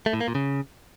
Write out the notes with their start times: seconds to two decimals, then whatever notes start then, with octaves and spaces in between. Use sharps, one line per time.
0.06 A3
0.13 A2
0.21 A#3
0.28 A#2
0.35 C#3